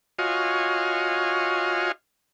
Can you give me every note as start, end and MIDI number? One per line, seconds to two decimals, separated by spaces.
0.19 1.92 65
0.19 1.92 66
0.19 1.92 73
0.19 1.92 75
0.19 1.92 77
0.19 1.92 80